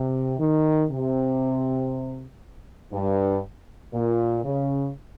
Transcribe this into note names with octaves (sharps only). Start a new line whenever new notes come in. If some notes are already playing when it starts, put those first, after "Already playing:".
Already playing: C3
D#3
C3
G2
A#2
C#3